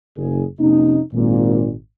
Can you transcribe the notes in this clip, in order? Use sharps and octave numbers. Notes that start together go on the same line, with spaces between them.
F#1 G#4
F2 C3 A#3 C#4 D#4
G#1 A#2